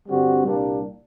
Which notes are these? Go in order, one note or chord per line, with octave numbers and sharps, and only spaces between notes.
G2 D3 G3 C4 F#4
C2 A#2 G3 A#3 D4